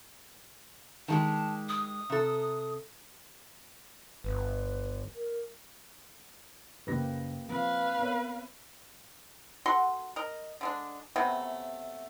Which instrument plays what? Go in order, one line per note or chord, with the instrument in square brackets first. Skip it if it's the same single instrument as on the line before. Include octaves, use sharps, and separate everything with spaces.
[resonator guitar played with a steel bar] D#3 G#3 G4 [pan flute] A5
[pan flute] D#6
[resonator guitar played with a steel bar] C3 A4
[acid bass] G1 [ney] B4
[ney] A#4
[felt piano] F#1 A#6 [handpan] A#3 G4 B4
[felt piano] F3 [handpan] C4 [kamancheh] B4 F5
[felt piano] B3 A#4 C#5
[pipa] F#4 A4 F#5 C6
A#4 D#5
D3 G#3 D4
C3 F#3 A3 B3